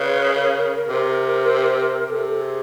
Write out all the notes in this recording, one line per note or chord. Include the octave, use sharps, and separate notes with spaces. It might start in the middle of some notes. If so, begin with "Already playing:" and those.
Already playing: C#3 B4
A#4
C3
C3 A4
A4
G#4